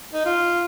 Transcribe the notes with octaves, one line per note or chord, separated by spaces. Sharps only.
D#4
F4